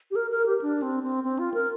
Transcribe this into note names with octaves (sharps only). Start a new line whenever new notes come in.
G4
A#4
A#4
G4
D4
C4
C4
C4
F4
A#4